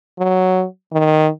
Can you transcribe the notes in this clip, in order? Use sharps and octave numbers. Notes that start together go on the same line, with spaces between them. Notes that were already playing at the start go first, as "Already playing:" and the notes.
F#3
D#3